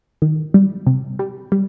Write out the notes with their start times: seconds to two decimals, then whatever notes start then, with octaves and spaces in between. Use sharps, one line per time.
0.22 D#3
0.54 G3
0.87 C3
1.19 G3
1.52 G3